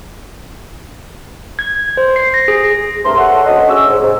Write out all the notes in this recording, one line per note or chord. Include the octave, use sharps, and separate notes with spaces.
G#6
C5
C7
A#6
G#4
C2 G2 A3 A#4 E5 C6
A4 C#5 E5 F#5
D2 C#4 C#5 D#5
C#4 G#4 D5 E6
G#2
G#2 C3